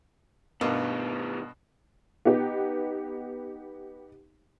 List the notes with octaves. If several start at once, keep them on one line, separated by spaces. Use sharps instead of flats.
G2 B2 D#3 A#3 B3
B3 D#4 G4